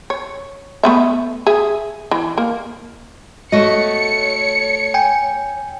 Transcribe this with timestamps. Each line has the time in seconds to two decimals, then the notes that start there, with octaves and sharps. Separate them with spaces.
0.10 C#5
0.83 A3 B3 E5
1.47 G#4 E5
2.11 E3
2.38 A#3
3.52 A3 F#4 C#5 D#5 C#7
4.94 G5 G#5